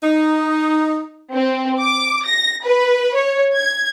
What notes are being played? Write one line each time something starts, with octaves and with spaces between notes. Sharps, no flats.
D#4
C4
D6
A#6
B4
C#5
G#6